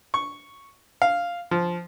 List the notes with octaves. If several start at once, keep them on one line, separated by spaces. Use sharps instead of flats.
C#6
F5
F3